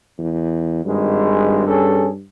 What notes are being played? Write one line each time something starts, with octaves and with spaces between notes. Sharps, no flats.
E2
G#1 G2 G#3
C#4 G#4 A4